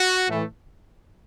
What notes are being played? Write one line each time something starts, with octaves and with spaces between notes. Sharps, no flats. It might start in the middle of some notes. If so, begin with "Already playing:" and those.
Already playing: F#4
A2 E3 A3